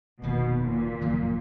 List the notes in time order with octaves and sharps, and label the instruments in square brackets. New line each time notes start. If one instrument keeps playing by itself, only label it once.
[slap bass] F1 D#2 D#3 [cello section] B2
[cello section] A#2
[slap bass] F#1 F2 D#3 F#3